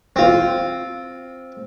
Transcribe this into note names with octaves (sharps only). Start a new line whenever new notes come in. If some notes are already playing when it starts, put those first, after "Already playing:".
C4 F4